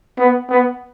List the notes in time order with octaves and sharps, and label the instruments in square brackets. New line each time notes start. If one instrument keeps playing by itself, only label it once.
[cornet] B3
B3